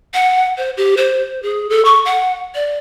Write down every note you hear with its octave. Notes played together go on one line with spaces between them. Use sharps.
F#5
C5
G4
C5
G#4
A4
C#6
F#5
D5